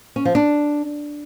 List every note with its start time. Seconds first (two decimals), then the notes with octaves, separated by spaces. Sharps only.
0.16 C#4
0.25 F3
0.35 D4